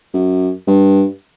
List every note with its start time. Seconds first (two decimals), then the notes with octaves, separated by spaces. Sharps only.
0.14 F#2
0.67 G2